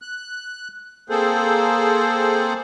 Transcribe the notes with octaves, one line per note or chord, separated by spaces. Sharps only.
F#6
A#3 C4 G#4 A4 C5